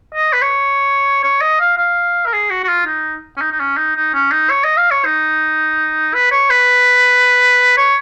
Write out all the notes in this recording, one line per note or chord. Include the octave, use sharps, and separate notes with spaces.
D#5
B4
C#5
C#5
D#5
F5
F5
A#4
G#4
F#4
F#4
F4
D#4
C#4
D#4
D#4
C#4
D#4
D#4
C#4
D#4
C#5
D#5
F5
C#5
D#4
B4
C#5
B4
C#5